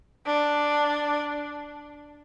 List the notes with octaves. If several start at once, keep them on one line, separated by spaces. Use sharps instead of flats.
D4